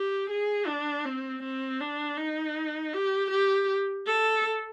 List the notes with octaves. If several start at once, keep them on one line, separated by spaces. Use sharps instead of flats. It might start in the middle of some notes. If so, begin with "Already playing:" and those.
Already playing: G4
G#4
D4
C4
C4
D4
D#4
G4
G4
A4